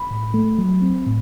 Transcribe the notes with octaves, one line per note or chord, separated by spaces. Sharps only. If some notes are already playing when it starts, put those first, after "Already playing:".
Already playing: B5
A2
A3
F#3
C4
A2